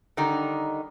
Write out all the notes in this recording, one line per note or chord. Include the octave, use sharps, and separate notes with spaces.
D3 D#3 G3 D#4